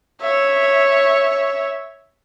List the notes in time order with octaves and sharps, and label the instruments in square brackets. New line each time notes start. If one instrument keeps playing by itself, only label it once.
[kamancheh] C#5 E5